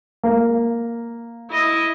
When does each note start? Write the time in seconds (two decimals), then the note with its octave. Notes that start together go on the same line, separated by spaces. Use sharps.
0.24 A#3
1.51 E4 D#5